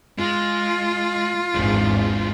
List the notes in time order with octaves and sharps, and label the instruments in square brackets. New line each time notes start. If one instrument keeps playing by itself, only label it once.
[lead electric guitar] G#3 [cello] F4
[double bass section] G#1 E2 G#2 [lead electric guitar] G#3 D4